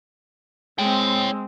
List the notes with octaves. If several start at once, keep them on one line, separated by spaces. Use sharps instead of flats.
G#3 C4 C#5 G5